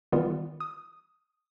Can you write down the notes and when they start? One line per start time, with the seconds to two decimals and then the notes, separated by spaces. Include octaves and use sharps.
0.12 D#3 E3 G3 B3 F4
0.60 D#6